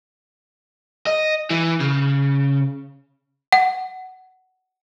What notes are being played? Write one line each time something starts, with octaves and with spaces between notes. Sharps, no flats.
D#5
E3
C#3
F#5